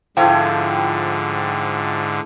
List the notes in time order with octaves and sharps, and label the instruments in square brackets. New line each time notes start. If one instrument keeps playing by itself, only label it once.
[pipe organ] G#2 D3 [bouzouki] F3 [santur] A3 E4 [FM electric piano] G5